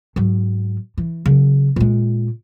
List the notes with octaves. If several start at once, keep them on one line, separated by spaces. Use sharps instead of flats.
G#2 F#3
E3
C#3 F#3
A#2 G#3